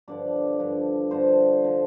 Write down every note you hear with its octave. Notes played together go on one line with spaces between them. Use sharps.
G2 D3 F3 D5
G2 D3 F3
G2 D3 F3 C5
D3 F3